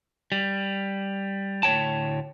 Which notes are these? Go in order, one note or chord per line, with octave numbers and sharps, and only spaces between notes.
G3
D2 A2 F#3 C#5 G5 A5